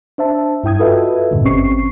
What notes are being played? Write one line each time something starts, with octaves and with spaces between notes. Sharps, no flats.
D4 C5 E5 A5
G2 E4 G5 D#6 G#6
F4 F#4 A4 B4 D#5 E5
E2 G2 A#2 D3
G#1 C4 C#4 G4 C#6 C7